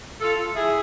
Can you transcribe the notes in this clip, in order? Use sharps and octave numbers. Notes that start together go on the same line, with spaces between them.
F4 A4
E4 G#4